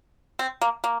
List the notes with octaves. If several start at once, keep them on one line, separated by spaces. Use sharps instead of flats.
C4
A#3
A#3